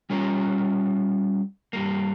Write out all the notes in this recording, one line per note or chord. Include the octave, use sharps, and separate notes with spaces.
G3 C#4 F4 A#4
G2 G3 A#3